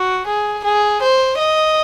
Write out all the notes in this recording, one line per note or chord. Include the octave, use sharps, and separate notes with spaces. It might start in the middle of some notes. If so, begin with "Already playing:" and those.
Already playing: F#4
G#4
G#4
C5
D#5